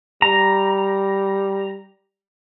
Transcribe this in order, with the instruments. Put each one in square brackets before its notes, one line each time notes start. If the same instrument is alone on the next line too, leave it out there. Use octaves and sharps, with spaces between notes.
[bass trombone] G3 [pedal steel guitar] A#5